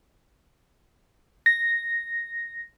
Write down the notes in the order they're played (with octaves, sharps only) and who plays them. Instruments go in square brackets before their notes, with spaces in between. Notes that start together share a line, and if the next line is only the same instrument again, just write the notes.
[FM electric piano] A#6